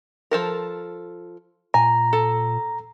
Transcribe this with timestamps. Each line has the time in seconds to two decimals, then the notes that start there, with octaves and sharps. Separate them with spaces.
0.31 F3 A4 A#4
1.74 A#2 G#5 A#5
2.13 A4